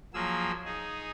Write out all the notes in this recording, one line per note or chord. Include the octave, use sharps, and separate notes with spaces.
F3 F#3 A#3 G#4 E6
D#4 G#4